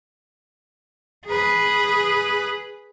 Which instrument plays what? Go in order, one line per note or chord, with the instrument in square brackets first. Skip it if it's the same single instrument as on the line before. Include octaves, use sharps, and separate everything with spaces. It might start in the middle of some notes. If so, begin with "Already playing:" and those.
[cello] G#4 B4